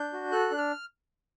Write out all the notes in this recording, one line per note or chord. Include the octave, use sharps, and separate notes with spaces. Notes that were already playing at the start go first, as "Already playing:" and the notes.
Already playing: D4 G6
F#4
A4 F#6
D4
F6